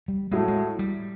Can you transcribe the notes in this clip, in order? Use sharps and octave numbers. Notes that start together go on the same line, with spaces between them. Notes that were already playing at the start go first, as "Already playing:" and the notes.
G3
A2 F#3 G#3 A3
G#3
G3